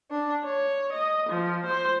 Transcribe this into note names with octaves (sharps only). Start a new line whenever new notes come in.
D4
C#5
D#5
F3
C5